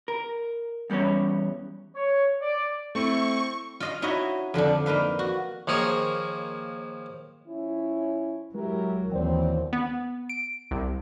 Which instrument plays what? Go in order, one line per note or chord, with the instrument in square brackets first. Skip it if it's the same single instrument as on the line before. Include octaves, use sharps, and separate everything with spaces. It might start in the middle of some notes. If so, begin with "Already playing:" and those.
[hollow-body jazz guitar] A#4
E2 G3 B3 C#4 C#5
[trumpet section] C#5
D5
[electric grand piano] A3 C4 E4 [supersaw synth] C#6
[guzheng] F4 D#5 F5
D#4 E4 F#4 C#5 D#5 E5
F2 D3 F3 D4
A#3 D#4 B4 F5
F#4
[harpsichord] D#2 F3 G#4 A#4 C#5
[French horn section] F3 C#4 E4
[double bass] F#3 [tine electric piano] G#3 [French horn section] E4 G4 A#4
[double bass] D#2 E3 [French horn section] F#3 B3 C4 [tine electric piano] C5 D5 G5
[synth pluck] B3
D7
C2